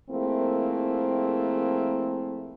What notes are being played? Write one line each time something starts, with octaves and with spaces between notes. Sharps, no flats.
F3 A3 A#3 C4 E4 G#4